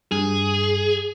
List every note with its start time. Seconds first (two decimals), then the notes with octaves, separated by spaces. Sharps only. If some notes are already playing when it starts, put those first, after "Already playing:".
0.12 G2 G#4